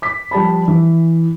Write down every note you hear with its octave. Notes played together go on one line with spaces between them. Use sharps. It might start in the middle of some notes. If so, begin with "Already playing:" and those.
D6 B6
F3 G3 A5 B5
E3